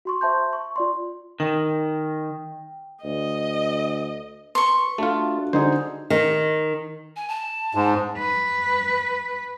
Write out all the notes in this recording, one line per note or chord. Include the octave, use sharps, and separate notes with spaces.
F#4 C6 C#6
C5 E5 A5 C6 G6
C#6
F4 D5 C6
D#3 G5
D2 D#5
B4 C6 C#6
A3 D4 F4 F#4 A5
D3 D#4 G#4 C5
D#3
G#5
A5
G#2
B4